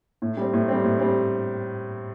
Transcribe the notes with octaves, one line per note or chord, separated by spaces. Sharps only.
A2
G3 C4
A2
G3 C4
A2
G3 C4